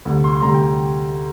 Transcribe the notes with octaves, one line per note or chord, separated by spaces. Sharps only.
D2 C3 G3
C6
C6
D2 C3 G3 A#5
G5